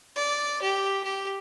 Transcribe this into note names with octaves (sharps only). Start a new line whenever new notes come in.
D5
G4
G4